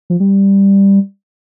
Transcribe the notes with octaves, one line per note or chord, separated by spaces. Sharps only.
F3
G3